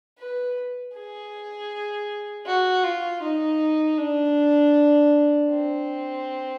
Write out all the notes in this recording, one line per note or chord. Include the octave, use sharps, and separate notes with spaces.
B4
G#4
F#4
F4
D#4
D4
C4